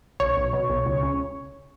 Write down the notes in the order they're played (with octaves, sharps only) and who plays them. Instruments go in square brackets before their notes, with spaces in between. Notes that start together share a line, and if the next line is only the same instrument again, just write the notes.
[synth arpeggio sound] B1 C#5
B1
B2
B1
C#2
C#3